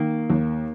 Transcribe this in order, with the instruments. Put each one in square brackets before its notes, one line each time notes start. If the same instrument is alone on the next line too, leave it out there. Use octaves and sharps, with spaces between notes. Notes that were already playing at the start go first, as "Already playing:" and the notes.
Already playing: [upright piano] D#3 [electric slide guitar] A#3
[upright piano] D#2